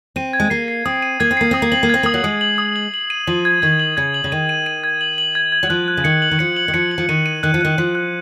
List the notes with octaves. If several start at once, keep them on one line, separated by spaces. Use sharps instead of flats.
C4 D#7
G#6
G#3
A#3 C7
C7
C4 D#6
D#7
A#3 G#6
C4
A#3 C7
C4 D#6
A#3
C4 F#7
A#3
C4 G#6
A#3 D#6
F#3
G#3 D#6
F#7
D#6
F#7
F#7
D#7
F3 F#7
G#6
D#3 G#6
F#7
C#3 G#6
F#7
C#3
D#3 D#7
D#7
D#7
G#6
F#7
F#7
G#6
G#6
F#3
F3 F#6
F#6
C#3
D#3 C#7
F#7
D#3
F3 C#7
F#7
D#3
F3 C#7
F#7
F3
D#3 D#7
D#7
D#3 F#6
F3
D#3 F#6
F3 F#6
F#6